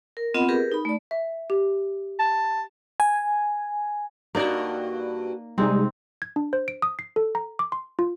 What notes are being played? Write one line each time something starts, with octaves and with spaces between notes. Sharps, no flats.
A#4
B3 C4 F4 D#5 F#5 B5
G4 G#4 A#4 B4
D#4 B5
A3 D5
E5
G4
A5
G#5
G2 A#3 D#4 F4 F#4 D5
C3 G3 G#3 C4 D#4
G#6
D4
C5
D7
D#6
C7
A4
A#5
D6
C6
F4